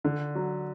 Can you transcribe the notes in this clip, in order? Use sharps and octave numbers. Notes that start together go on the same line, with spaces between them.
D3
F#3